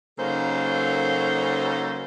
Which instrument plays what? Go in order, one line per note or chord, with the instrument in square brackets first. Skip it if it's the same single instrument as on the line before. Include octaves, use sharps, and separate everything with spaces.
[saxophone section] C#3 F#3 A#3 D#4 A4 C5